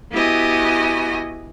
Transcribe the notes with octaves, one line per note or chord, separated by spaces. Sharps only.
B3 E4 F#4 G4 D#5 G#5